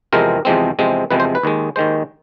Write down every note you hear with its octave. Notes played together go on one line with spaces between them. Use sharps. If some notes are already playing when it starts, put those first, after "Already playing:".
E2 C3 F3 G#3 C4 A#4
E2 C3 F3 G#3 C4
E2 C3 F3 G#3 C4
E2 C3 F3 G#3 C4 B4
C5
B4
D#2 D#3 G#3
D#2 D#3 G#3 C5